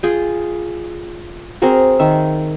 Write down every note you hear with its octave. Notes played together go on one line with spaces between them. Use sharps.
F4 G#4 G5
C4 F#4 G#4 A#4
D#3 E5